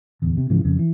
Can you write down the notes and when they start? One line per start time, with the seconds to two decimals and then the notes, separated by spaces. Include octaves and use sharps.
0.22 D1 E2
0.37 C3
0.50 G#2 C#3 E3 F3
0.65 F2 C#3
0.79 E3